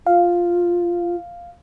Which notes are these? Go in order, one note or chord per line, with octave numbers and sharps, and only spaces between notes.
F4 F5